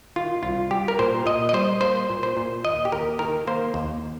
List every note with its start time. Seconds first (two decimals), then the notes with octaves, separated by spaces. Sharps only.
0.16 D#3 F4
0.43 C2 F4
0.71 G3 G4
0.88 A#4
0.99 A#2 C5
1.26 A#2 D#5
1.49 D#5
1.53 G3 C5
1.81 A#3 C5
2.10 A#2
2.23 C5
2.37 A#2
2.65 D#2 D#5
2.85 G4
2.92 D#2 A#4
3.19 D#3 A#4
3.47 A#3 C5
3.74 D#2